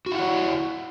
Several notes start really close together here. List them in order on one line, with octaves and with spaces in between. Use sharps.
F#4 E4 F#5 C#5